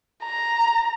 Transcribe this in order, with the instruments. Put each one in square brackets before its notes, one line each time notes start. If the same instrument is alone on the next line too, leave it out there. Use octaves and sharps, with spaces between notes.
[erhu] A#5